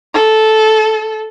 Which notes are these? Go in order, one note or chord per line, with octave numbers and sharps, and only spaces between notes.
A4